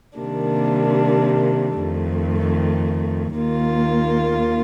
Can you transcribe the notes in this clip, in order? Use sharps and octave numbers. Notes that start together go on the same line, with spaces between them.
C3 D#3 G3 A#3 D4
F2 D#3 A3
D#2 D#3 A#3 F4